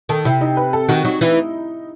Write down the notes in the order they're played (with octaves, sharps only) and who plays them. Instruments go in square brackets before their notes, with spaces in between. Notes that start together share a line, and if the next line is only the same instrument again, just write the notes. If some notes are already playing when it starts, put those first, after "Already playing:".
[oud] D#3 [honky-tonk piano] A4
[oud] C3 [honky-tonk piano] E4
[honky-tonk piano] D#4
B4
A4
[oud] D#3 [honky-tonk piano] F#4
[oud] F#3 [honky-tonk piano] D#4
[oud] E3